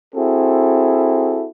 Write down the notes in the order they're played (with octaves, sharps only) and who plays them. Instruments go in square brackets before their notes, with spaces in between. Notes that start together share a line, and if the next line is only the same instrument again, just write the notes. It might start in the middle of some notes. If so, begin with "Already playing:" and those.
[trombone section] C4 E4 F#4 G#4 A4